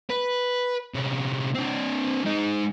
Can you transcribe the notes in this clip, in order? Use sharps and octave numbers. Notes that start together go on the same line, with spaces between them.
B4
C3 C#4
C4 D4
G#3 D#4